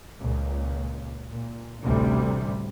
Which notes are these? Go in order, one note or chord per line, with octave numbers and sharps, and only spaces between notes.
C#2 A#2
A#2
A1 D2 C3 G3